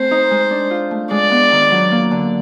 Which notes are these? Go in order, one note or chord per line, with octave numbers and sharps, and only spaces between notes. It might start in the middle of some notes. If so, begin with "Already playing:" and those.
Already playing: A3 C4 C5
D#4
G#3
D4
F4
A3
G#3 D5
B3
D#3
F#3
A#3
D3